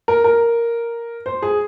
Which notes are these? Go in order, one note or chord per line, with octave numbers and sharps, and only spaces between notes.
A#4
A#4
C5
G#4